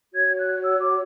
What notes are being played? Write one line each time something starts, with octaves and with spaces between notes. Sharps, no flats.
F#4 C#5 G#6
F#6
E6
D6